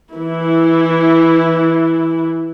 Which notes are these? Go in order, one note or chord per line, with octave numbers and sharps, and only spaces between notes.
E3 E4